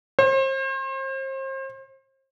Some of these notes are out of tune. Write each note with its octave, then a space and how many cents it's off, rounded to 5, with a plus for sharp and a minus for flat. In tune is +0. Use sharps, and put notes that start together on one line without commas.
C5 +35